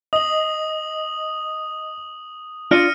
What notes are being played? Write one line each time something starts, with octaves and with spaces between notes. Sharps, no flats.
D#5 D#6 F#7
D4 F4 D5 F6 A#6 C#7 D#7